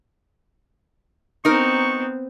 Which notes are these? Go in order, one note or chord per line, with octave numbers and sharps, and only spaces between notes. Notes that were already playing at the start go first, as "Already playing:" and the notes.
B3 C4 D#4 A#4 C#6